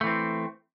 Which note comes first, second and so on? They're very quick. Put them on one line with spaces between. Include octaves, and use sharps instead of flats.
A3 E3 C4